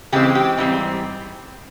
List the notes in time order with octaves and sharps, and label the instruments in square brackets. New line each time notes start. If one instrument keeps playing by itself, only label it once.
[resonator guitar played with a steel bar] C#3 E3 G#3 C4 G4
G4
G#2 E3 G3 C4